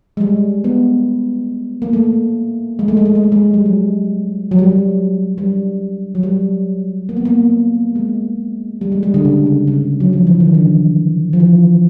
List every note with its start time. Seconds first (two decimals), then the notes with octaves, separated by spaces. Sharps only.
0.17 G#3
0.21 G3
0.64 B3
1.82 A#3
1.93 A3
2.79 G#3
2.88 A3
2.97 G#3
3.06 A3
3.15 G#3
3.23 A3
3.32 G#3
3.54 G3
3.66 F#3
4.51 F#3
4.59 G3
4.66 F#3
5.38 G3
6.15 F#3
6.23 G3
7.09 A#3
7.17 B3
7.25 A#3
7.95 G#3
8.81 G3
8.92 G#3
9.03 G3
9.14 D3
9.25 C#3
9.46 C#3
9.67 C#3
10.00 F#3
10.13 F3
10.27 E3
10.40 D#3
10.54 D3
11.33 F3
11.39 E3